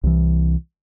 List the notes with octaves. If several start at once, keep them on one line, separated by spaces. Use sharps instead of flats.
C2 E3